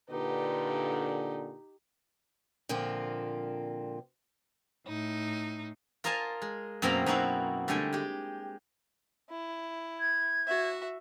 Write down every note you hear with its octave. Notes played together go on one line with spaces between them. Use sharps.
A#2 D3 D#4 G4 B4
A#2 D3 F3 A#3 C4
A2 D#4
F4 A#4 D#5 F5 G#5 A5
G#3
F#2 B2 A#3 C4 F5 A#5
F#2 D#4 E4 F#4 F5
D3 G3 A3 G5 G#5
G#3 G4
E4
G#6
F#4 E5